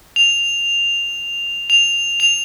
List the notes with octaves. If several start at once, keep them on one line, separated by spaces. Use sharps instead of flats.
F7
F7
F7